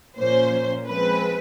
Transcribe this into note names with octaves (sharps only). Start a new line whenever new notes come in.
A#2 F3 A#3 C#4 C5
F3 G#3 C4 B4